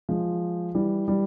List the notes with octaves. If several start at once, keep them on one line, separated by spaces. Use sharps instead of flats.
F3 G#3
E3 G3
E3 G3